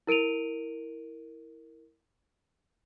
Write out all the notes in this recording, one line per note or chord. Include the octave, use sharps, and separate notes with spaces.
E4 A#4 D7 D#7 F7